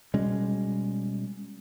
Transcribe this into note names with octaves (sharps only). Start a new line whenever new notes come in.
B2 G3 G#3 C#4